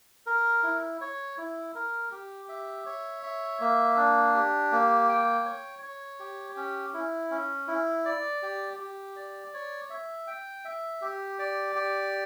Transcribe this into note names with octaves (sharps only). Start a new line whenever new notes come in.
A#4
E4
C#5
E4
A#4
G4
E5
C#5
E5
A#3
D4
G4
A#3
G5
C#5
C#5
G4
C#4
E4
C#4
E4
D5
G4
G4
D5
C#5
E5
G5
E5
G4
D5
G4